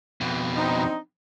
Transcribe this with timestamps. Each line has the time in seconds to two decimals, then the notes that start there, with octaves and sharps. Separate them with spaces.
0.21 F2 B2
0.55 C4 D4 D#4